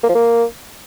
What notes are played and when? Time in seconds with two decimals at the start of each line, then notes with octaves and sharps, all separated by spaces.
0.04 A#3
0.09 F3
0.15 A#3